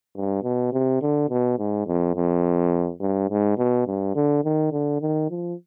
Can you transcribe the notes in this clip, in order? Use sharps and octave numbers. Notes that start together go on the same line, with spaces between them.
G2
B2
C3
D3
B2
G#2
F2
F2
G2
G#2
B2
G2
D3
D#3
D3
D#3
F3